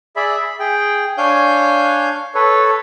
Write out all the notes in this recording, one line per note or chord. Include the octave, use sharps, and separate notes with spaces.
G#4 D5 E5 B5
B5
G#4 G5
D4 C#5 F5 G#5 G6
A4 B4 C#5